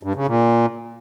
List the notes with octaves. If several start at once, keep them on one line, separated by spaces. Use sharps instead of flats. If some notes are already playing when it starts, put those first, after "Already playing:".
G2
C#3
A#2